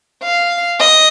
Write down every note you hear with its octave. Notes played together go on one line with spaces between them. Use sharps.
F5
D#5